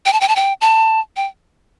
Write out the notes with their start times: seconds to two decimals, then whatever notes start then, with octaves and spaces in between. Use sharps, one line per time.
0.06 G5
0.13 A5
0.21 G5
0.28 A5
0.36 G5
0.61 A5
1.16 G5